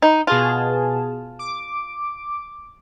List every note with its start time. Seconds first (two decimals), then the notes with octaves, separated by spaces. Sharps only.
0.02 D#4
0.27 B2 F4 G#4 A5
1.39 D6